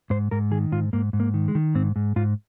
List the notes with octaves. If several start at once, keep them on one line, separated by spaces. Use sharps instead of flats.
G#2 C5
G#2 A#4
D#3 G#4
G#2 F4
G#2 A#3
G#2
A#3
D#3
G#3
D#3
G#2 C4
G#2
G#2 F4